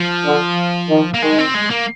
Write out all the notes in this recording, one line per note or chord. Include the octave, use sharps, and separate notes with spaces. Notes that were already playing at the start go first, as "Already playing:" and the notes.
Already playing: F3
D3
D#3
A#3
D#3 G#3
C4
G#3
A#3